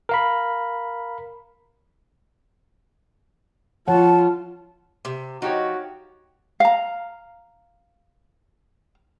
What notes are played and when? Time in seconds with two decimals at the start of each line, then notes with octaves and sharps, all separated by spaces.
0.09 A#4 F5 B5
3.88 F3 F4 C#5 F#5 A5
5.05 C3
5.42 F3 D#4 F#4 G4 C#5
6.60 F5 A#5